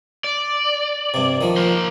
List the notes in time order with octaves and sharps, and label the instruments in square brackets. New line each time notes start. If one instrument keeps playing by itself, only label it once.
[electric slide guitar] D5
[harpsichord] G2 C3
D#3 F3
[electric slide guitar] A#3 A#4 C5